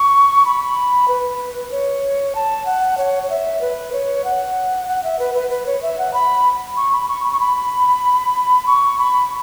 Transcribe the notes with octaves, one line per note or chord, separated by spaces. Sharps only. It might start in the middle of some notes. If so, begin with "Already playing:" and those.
Already playing: C#6
B5
B4
C#5
A5
F#5
C#5
C#5
E5
B4
C#5
F#5
F#5
E5
B4
B4
B4
C#5
E5
F#5
B5
C#6
B5
C#6
B5
C#6
B5
C#6
B5